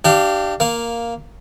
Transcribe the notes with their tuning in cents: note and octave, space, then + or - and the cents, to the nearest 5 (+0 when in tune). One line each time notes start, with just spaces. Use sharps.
D4 +20 G4 -20 F5 -20
A#3 +0 F5 +0